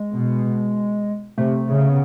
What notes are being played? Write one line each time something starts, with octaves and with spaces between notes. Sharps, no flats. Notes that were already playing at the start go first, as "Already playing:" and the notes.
Already playing: G#3
B2
C3 A3
C#3
B3